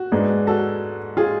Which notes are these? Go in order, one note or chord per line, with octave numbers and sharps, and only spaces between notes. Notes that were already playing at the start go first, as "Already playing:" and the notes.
Already playing: F#4
G#2 G#3 B3 D4
F#4 A4
F4 G#4